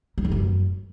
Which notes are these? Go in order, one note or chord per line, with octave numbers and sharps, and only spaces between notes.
G3
D#3
F#2